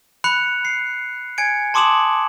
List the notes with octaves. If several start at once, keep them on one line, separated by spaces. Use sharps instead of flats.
B5 F#6 C#7 F7
C7
G#5 G#6 C#7 D7
A5 C6 D6 D#6 E7 F#7